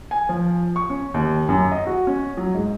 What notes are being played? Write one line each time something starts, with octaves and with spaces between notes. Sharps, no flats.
G#5
F3
C#6
C#4
D#2
F#2
D#5
F#4
C#4
F#3
G#2